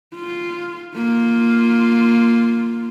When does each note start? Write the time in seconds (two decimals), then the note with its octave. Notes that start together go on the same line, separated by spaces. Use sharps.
0.16 F4
0.96 A#3 F4